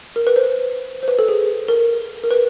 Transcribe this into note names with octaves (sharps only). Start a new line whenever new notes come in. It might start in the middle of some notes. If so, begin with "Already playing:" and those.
A#4
B4
C5
C5
B4
A4
G#4
A#4
A#4
B4